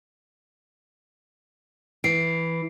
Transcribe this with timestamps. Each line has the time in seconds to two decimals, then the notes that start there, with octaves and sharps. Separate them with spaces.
2.04 E3 C7 D7